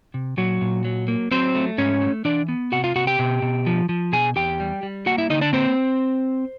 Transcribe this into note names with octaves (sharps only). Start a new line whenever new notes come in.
C3
A#2 F#3 F#4
A#2
F#3
A#3
F#3 C4 C5
A3
G#2 C#4 C#5
A3
E3 D4 D5
B3
C3 F#4 F#5
F4 F5
C3 F#4 F#5
G4 G5
B2
B2
F3
F3
B2 G#4 G#5
E2 G4 G5
G3
G3
A#3 F#4 F#5
E4 E5
D3 D#4 D#5
D4 D5
A#3 C4 C5